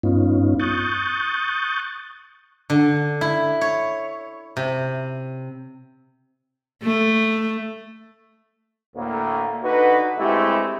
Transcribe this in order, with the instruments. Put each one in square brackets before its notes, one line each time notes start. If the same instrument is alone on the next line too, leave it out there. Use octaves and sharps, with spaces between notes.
[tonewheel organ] G2 B3 C#4 D#4 F4
C#6 D#6 F#6 G6 A6
[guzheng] D3
E4
C#5
C3
[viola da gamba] A3
[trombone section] D2 A2 A#3
D3 D#4 F#4 B4
G2 G#3 A3 C4 E4 G4